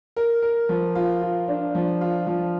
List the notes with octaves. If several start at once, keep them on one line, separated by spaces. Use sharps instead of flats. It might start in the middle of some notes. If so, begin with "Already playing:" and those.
A#4
A#4
F3
F4
F4
D4
F3
F4
F3